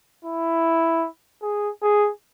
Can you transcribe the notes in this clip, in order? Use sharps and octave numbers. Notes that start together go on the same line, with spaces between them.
E4
G#4
G#4